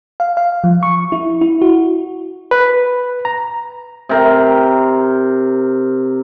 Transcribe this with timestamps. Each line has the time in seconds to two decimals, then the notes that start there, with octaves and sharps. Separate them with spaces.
0.20 F5
0.37 F5
0.64 F3
0.83 C#6
1.12 E4
1.41 E4
1.62 F#4
2.51 B4
3.25 A#5
4.09 C3 A#4